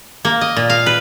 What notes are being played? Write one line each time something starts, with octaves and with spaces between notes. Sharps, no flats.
A#3
D#5
A#2
F5
B4